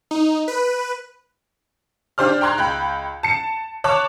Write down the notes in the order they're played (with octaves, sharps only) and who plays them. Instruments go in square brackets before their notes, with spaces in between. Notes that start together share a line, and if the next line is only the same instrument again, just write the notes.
[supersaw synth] D#4
B4
[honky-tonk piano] D4 G4 C5 D5 F6
G5 A#5 C6 F#6 G#6
C#2 G5 B5
A5 C#7
C#5 A5 D6 F#6